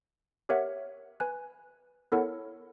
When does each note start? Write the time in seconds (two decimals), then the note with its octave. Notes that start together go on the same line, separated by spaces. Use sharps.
0.49 G4 A#4 C#5 E5 F#5
1.20 B4 G#5 F#6
2.12 B3 E4 A4 A#4 C#5 F#5